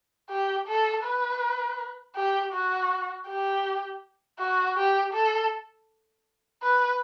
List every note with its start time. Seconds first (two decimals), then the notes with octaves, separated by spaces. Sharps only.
0.30 G4
0.67 A4
1.04 B4
2.16 G4
2.53 F#4
3.28 G4
4.39 F#4
4.77 G4
5.13 A4
6.62 B4